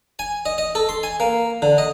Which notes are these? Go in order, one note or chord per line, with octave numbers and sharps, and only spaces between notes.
G#5
D#5
D#5
A4
C6
G#5
A#3
D3
D#5